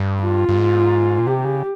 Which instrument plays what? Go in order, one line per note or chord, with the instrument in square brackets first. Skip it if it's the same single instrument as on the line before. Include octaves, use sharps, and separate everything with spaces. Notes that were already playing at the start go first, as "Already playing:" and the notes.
Already playing: [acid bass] G2
[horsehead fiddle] F4
[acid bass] G2
G#2
A#2
[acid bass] C3 [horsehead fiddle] G4
[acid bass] C#3